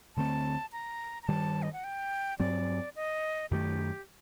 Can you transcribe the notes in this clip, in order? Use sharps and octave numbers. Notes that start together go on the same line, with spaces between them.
D2 D3 A3 C4 A5
A#5
A#5
G2 D#3 G3 A5
D#5
F#5
G5
G2 F#3 C4 D5
D#5
F#2 D#3 A3 G4